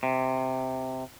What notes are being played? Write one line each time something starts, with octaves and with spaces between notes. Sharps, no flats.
C3